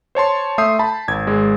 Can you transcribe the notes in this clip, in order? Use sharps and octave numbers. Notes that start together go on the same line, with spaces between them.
C5 C#5 A5 C6
A3 E5 C6 D#6 G6 C7
A5 B5
G#1 G#6
G#1 G#3